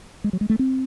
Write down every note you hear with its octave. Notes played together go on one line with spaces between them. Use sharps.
G#3
F#3
G#3
A3
C4